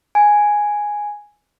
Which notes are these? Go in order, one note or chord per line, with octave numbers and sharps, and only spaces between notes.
G#5